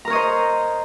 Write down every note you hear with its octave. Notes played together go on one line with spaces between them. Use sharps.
A#4 C5 C#5 D#5 A#5